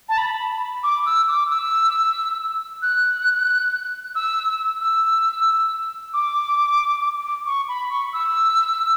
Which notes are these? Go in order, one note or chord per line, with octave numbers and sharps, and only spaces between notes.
A5
B5
D6
E6
D6
E6
F#6
E6
E6
D6
C#6
B5
C#6
E6